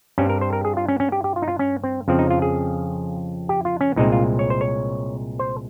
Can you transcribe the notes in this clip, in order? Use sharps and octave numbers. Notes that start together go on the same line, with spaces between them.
G2 G3 C4 C#4
A#4
C5
A#4
G#4
F4
C#4
C#4
G4
G4
F4
D#4
F4
C#4
C4
F2 C#3 F3 C4
D#4
F4
G#4
G4
F4
C#4
C2 A#2 G#3 C4 D#4
F4
C#5
C5
C#5
C5